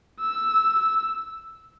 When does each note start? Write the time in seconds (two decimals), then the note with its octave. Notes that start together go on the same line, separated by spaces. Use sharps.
0.21 E6
0.79 E6